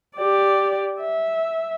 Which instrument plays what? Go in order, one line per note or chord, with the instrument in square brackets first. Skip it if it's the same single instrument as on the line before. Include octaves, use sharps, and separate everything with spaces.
[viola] G4 D5
E5